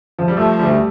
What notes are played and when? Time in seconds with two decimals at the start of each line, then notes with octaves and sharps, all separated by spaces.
0.19 F3
0.28 G3
0.37 F3 A3
0.59 D2 G3